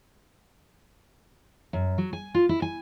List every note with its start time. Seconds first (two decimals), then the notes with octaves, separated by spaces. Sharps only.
1.73 F#2
1.98 F#3
2.13 G#5
2.34 F4
2.49 E4
2.62 G#5